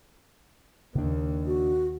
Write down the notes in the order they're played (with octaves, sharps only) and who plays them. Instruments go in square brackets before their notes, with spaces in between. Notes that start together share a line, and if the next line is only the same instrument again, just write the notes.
[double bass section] D#2 [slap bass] C#3 D4
[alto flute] F#4